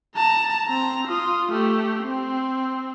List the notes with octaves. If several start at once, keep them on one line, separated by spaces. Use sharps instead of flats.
A5 A#5
C4 A#5
F4 D#6
A3 G4
C4